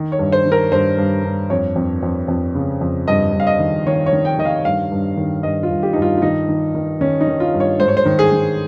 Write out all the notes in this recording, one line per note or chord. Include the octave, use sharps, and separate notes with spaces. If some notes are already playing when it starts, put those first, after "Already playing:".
Already playing: D#3
C#5
G2
C5
D#3
A#4
G2 C5
G2
G2
F2 C#5
F2
F2
F2
C#3
F2
G2 D#5
G2
F5
D#5
D#3
D#3 C#5
C#5
D#3
G5
D#3 D#5
F5
G2 F5
G2
D#3
G2 D#5
F4
G2
G4
G2 D#4
F4
F4
D#3 D#4
D#3
D#3
D#3 C#4
D#4
D#3
F4
G2
C#5
G#2 C5
C#5
C5
D#3
G#4
D#3